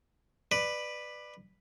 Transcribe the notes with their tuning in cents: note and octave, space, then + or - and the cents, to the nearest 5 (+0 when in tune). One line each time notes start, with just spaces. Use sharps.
B4 +0 D5 +20